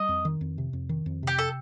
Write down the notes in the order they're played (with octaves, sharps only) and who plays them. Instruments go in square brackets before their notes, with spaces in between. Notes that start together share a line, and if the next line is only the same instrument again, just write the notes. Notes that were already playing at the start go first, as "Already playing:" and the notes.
Already playing: [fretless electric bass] G3 [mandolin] D#5
[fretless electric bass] F2
D#3
F2
C3
F2
D#3
F2
[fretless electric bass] C3 [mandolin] G4
[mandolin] A4